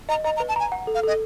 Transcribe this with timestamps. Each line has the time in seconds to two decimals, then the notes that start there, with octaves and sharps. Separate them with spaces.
0.09 D#5 A#5
0.24 D#5 A#5
0.37 A#5
0.40 B4
0.49 A5
0.56 G#5 A#5
0.72 F#5
0.87 A4
0.95 F5
1.03 A4 D#5